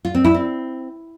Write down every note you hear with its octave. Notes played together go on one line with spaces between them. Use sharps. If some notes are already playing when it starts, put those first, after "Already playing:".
F4
C4
E4
C4